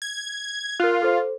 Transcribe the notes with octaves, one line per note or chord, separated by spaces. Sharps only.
G#6
F4 A#4 F#6
A4 C5